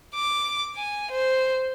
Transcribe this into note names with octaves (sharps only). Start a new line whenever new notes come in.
D6
G#5
C5